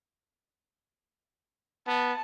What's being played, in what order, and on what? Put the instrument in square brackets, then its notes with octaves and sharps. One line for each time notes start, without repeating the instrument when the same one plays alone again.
[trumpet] B3 [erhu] A5